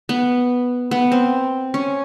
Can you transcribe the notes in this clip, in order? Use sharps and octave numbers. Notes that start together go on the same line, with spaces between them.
B3
B3
C4
C#4